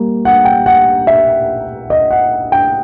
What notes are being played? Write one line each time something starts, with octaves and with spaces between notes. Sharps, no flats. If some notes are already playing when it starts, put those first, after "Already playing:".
Already playing: G3 A#3
F#5
G5
F#5
E5
D#5
F#5
G5